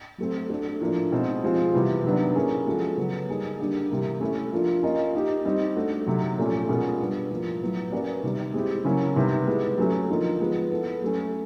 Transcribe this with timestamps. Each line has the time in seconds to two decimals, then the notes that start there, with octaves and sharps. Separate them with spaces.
0.18 F#3 A3 C4
0.50 A3 D4 F#4 A4
0.81 A2 F3 A#3 D4
1.12 B2 G#3 C4 D#4 G#4
1.43 F3 G#3 C4 F4 G#4
1.74 C3 E3 G3 B3
2.04 C3 D#3 F#3 B3 D4
2.35 A#3 C#4 E4 G#4
2.66 F3 G#3 C#4 F#4 A4
2.97 C#3 F#3 B3
3.29 G3 A#3 D#4 G#4
3.60 D3 G3 A#3 D4 G4
3.90 C3 E3 G3 A#3
4.21 A3 C#4 E4
4.52 F3 A#3 D4 F4
4.83 A#3 C#4 F4 A#4 D#5
5.14 A#3 D#4 G4
5.45 G3 C4 D#4
5.76 A3 D4 F#4
6.07 C3 D#3 F#3
6.38 A#2 F3 A3 C#4
6.69 B2 G#3 C#4 F4 A#4
6.99 G3 B3 D4
7.31 A2 F3 A#3
7.62 A2 F#3 B3
7.92 A#3 C#4 F#4 B4 D5
8.23 C3 D#3 G3
8.54 G#3 C4 E4 G4
8.85 C#3 F#3 A#3 C#4 E4
9.16 C3 D#3 G3 B3
9.47 G#3 B3 E4
9.78 F#3 A3 C#4 F#4
10.09 D3 F3 A#3 D#4
10.40 F3 G#3 B3
10.71 B3 E4 A4
11.02 F#3 A3 C#4